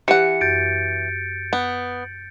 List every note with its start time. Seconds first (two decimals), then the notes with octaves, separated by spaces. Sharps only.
0.08 E3 G4 F#5 C#7
0.41 F#2 G6 A6 D7
1.53 B3